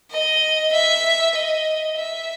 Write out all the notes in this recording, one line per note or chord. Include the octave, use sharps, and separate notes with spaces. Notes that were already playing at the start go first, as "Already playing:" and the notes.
D#5
E5
D#5
E5